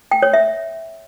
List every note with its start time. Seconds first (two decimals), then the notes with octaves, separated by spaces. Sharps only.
0.11 G5
0.22 C#5
0.34 E5